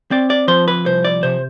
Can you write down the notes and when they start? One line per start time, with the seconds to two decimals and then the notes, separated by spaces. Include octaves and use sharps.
0.11 C4 D5
0.30 D5
0.48 F3 C5
0.68 B4
0.86 C2 C5
1.04 D5
1.23 C3 C5